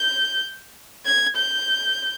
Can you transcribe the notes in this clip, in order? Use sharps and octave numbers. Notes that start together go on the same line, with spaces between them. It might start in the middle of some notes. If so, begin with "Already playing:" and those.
Already playing: G6
G#6
G6